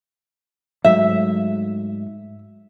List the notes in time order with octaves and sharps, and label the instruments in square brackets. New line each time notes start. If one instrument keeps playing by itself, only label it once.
[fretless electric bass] G#2 F#3 A3 [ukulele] E5